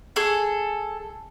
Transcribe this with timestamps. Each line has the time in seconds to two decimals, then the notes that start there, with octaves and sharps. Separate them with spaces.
0.16 G#4 A4